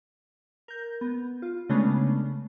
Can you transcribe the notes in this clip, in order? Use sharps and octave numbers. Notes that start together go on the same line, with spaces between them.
A#4 G6
B3
F4
C#3 G#3 A3 B3 C#4 D4